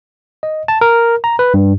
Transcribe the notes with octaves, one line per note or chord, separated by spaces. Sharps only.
D#5
A5
A#4
A#5
B4
G2